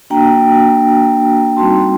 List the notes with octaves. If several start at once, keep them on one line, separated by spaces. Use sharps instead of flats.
A#3 D4 F#4 G5 A#5
G3 C4 D#4 F#4 A5 C6